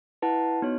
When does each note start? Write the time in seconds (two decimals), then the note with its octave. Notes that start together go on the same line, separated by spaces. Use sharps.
0.22 E4 B4 F#5 A5
0.62 B3 D#4 F#4 C#5